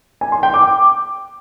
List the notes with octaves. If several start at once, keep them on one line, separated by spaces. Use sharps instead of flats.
G#5
C6
G5
D6